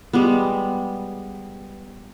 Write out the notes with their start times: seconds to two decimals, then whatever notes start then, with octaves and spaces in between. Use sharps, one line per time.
0.13 G3 G#3 B3